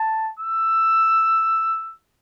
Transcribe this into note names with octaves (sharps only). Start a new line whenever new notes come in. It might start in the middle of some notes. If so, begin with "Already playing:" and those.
Already playing: A5
E6